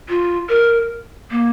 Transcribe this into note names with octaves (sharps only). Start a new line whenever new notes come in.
F4
A#4
A#3